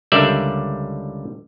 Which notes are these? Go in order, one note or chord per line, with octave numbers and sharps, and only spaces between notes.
C#2 D3 G3 A#4 D5 E5